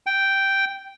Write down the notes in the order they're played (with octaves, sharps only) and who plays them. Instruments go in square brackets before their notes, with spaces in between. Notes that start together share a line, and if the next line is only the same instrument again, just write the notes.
[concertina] G5